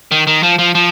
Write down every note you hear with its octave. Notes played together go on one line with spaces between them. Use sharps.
D#3
D#3
F3
F3
F3